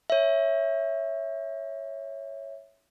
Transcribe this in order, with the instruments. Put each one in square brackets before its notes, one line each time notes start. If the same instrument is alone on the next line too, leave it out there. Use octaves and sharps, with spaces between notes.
[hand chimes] C#5 E5